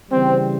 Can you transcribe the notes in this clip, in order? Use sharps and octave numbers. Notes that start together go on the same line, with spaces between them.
C#3 E3 G3 C4